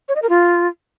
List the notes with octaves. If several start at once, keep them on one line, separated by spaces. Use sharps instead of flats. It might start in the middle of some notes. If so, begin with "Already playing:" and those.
C#5
D#5
A#4
F4